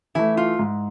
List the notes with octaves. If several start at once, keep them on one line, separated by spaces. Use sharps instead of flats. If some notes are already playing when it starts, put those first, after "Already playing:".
E3 A3 E4
F4
G#2